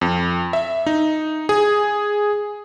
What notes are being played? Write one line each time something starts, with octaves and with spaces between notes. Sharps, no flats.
F2
E5
D#4
G#4